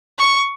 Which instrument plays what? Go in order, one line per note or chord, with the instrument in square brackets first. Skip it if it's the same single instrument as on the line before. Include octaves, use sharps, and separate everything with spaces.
[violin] C#6